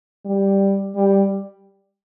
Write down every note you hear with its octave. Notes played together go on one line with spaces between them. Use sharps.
G3
G3